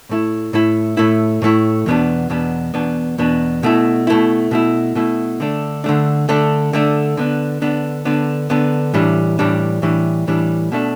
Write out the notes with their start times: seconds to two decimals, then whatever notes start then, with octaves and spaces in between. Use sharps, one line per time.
0.09 A2 A3 E4
0.53 A2 A3 E4
0.97 A2 A3 E4
1.42 A2 A3 E4
1.86 E2 B2 B3 D4
2.30 E2 B2 B3 D4
2.74 E2 B2 B3 D4
3.18 E2 B2 B3 D4
3.63 B2 A3 E4
4.07 B2 A3 E4
4.51 B2 A3 E4
4.95 B2 A3 E4
5.40 D3 A3 D4
5.84 D3 A3 D4
6.29 D3 A3 D4
6.73 D3 A3 D4
7.17 D3 B3 D4
7.62 D3 B3 D4
8.05 D3 B3 D4
8.50 D3 B3 D4
8.94 A2 E3 G3 D4
9.39 A2 E3 G3 D4
9.82 A2 E3 G3 D4
10.27 A2 E3 G3 D4
10.72 B2 A3 D4